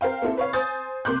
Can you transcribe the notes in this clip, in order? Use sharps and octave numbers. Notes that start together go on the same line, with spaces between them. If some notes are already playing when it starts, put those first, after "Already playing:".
A#4 C5 F5 G5
A#3 C4 E4 A4
B4 C#5 F5
C5 G#5 D#6 G6 A6
C2 A#3 C6 D6 F#6 G6